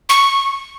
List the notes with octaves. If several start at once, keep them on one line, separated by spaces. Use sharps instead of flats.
C#6